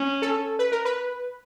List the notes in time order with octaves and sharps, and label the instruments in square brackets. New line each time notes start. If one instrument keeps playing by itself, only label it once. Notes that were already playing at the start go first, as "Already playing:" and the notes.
Already playing: [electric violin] C#4
[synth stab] A4
B4
A#4
B4